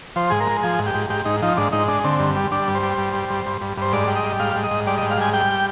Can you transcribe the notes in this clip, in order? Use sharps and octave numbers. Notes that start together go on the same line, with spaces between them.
F3 C5
G#2 G#4
A#4
G#3
F3 G#4
G#2
G4
G#2
G#2 G4
G#2 D#4
F3 D#4
G#2 D4
G#2 D#4
G#3 D4
D3 C4
G2
G3
G3 D4
G2
C5
G3
G2
G3
G2
G2
G2
G2 C5
G#2 D5
G3
D#5
G3
G#2 F5
G#2
D#5
G#2
G3 D5
D#5
G#2
F5
G3 G#5
G3 G5